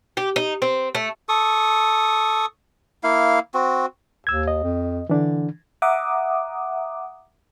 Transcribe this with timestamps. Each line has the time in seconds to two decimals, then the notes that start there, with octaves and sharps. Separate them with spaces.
0.17 G4
0.36 D#4
0.62 C4
0.95 A3
1.29 A4 C#6 D#6
3.03 A#3 E4 F5
3.54 C4 F#4
4.27 D#2 E6 G#6
4.48 D#5
4.63 F2
5.10 D3 E3 D4
5.82 E5 F#5 A#5 D6 D#6